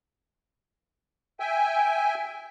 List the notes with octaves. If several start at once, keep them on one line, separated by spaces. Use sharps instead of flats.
E5 G5 G#5